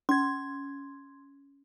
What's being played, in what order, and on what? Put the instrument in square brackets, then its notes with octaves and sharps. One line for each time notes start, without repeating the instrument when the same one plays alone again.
[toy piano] C#4 [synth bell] C6 G#6